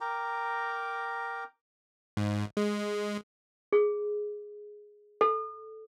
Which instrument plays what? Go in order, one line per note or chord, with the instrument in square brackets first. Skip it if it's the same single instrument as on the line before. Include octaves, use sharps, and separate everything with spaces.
[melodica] A#4 G5 A#5 D6
[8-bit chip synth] G#2
G#3
[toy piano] G#4
A4